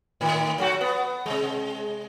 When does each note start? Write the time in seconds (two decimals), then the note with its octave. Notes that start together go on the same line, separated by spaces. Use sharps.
0.21 A2 D#3
0.58 F#3 A3 F#4
0.81 B3
1.26 C3 G#3